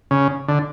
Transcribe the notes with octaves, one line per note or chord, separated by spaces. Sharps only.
C#3
D3